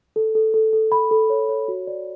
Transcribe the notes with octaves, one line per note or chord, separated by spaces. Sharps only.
A4
A4
A4
A4
B5
A4
C#5
C#5
F#4
D5